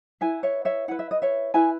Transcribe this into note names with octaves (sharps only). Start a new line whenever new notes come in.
E4 B4 E5 G#5
C#5 E5
C#5 E5
E4 B4 F#5
E5
D#5
C#5 E5
E4 B4 E5 G#5